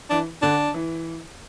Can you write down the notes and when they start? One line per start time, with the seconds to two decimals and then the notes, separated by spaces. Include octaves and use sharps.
0.10 E3 D4
0.42 D3 D4
0.74 E3